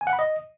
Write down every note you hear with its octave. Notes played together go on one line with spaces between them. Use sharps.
G#5
F#5
B5
D#5